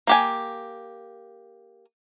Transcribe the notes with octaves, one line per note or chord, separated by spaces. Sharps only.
A#3 G4 G#5